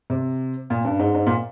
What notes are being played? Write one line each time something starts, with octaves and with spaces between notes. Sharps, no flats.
C3
A#2
G2
G#2
G#2
A#2